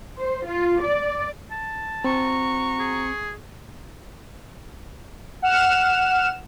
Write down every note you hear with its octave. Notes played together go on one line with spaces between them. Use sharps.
C5
F4
D5
A5
C4 F#4 A#5 C#6
G#4
F#5 F6 E7